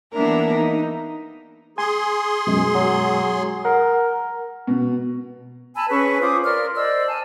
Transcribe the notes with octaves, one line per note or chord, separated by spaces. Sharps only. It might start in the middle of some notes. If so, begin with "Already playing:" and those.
E3 A#3 B3 D4 A#4 E5
D#4
G#4 G#5 C6
F#2 B2 G#3
F#3
A#4 F#5
B2
G#5 A5 B5 E6
C#4 G#4 B4 C#6
F4 C5 D6 D#6
A#4 D5 C6 F6
C5 D5 D#5 E6
G#5 A5